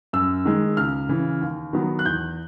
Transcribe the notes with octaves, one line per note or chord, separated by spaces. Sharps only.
F#2 E6
D#3 G#3
C#2 F6
C#3 E3
D#2
D#3 F#3 B3
F#6
E2 G6